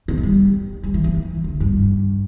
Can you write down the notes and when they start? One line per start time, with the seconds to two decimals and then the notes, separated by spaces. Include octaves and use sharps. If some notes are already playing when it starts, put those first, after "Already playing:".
0.08 B2
0.17 E3
0.23 G3
0.83 G3
0.94 E3
1.04 E3
1.14 E3
1.44 D3
1.60 G2